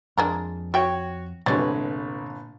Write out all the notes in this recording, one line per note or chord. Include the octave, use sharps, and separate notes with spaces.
F2 G#3 D4 A#4
F#4 C#5 E5 G5
G1 C2 A#2 E3 G#3 B4 C#5 A6